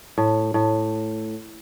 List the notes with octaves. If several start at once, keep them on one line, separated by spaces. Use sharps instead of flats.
A2
A2